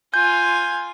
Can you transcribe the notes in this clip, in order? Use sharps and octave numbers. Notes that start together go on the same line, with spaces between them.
F4 G#5 G6